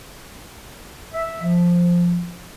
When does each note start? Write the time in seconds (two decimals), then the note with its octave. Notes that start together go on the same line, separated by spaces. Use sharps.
1.13 E5
1.42 F3